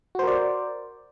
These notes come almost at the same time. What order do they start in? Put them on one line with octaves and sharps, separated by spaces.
F#4 C5 A#4 D5